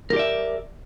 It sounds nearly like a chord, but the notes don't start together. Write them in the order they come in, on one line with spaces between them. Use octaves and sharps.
A#4 G4 D5 E5